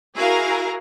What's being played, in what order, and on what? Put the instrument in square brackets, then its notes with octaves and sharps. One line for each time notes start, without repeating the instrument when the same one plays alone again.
[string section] E4 F#4 G#4 A#4 F5